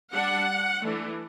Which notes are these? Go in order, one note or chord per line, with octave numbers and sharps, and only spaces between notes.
G3 D4 F#5
E3 A3 D4